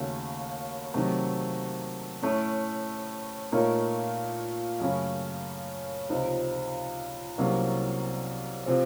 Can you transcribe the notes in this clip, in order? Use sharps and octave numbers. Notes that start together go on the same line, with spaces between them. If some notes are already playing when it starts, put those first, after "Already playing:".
Already playing: D#2 C#3 A3 C#4 F#4
C3 D#3 F#3 A3
A2 A3 C#4
A#2 A3 D#4 A#4 C#5
F#2 C#3 A3 C#4
C#2 C3 F3 C4 D#4
C2 C3 F#3 A#3 C#4
C3 F3 C4